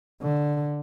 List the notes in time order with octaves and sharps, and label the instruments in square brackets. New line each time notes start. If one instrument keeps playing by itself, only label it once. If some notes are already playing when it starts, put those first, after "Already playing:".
[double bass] D3